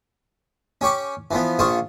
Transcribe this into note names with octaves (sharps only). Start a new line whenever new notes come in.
C#4 G4 C#6 D6
E3 F3 B3
A#1 F4 C5 C#6 D#6